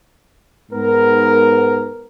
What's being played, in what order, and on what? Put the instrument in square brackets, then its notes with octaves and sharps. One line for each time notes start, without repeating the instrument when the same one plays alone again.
[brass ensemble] G#2 B3 A#4